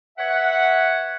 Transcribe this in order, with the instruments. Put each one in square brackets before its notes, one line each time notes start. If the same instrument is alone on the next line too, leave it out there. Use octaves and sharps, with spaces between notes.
[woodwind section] B4 C#5 E5 F#5